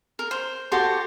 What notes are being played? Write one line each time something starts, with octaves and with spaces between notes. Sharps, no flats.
A#4
C5
F#4 G4 A4 C6